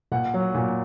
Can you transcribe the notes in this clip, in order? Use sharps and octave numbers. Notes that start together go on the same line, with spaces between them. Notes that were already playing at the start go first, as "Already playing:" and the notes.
A#2 F#5
F#3
A#2